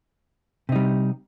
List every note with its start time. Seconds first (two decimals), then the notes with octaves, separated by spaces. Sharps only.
0.69 C3
0.72 D#4
0.76 G3